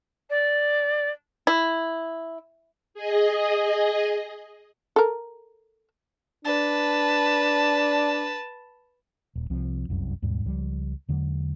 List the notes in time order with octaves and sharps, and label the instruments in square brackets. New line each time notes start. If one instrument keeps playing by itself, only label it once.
[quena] D5
[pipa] E4
[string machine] G#4 D#5
[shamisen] A4 A#4
[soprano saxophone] D4 [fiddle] B4 A5
[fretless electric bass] D#1
C2 F3 C4
F1 C2 F#2 C3
D#2 G#2 B2 G3
C#2 F3 G3
E2 D3 F#3 G#3